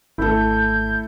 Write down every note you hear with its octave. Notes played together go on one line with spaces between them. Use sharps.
G#1 A3 E4 A4 G6